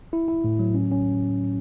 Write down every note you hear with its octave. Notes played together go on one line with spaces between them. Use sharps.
E4
E4
A2
F#3
C#4
C#4